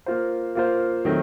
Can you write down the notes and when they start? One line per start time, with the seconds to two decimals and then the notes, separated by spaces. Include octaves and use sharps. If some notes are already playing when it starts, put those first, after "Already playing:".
0.06 A#3 F4 C5
0.55 A#3 F4 C5
1.05 D#3 F#3 A3 C4